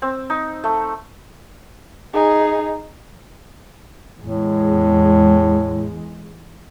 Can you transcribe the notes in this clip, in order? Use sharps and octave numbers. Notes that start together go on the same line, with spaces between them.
C4
D#4
A3
D#4 G#4
E2 A2 G#3